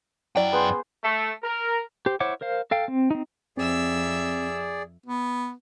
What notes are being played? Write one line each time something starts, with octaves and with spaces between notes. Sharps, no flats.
F#2 F#3 E4 D5 G5
B3 G#4 C5
A3
A#4
G4 C5
E4 C5 C#5 F#5 D6
A#4 C5 F5
A4 F5 G5
C4
C4 D#4
F2 C4 G#4 D5 E5 E6
B3